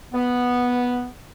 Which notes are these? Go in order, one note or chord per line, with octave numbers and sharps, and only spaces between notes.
B3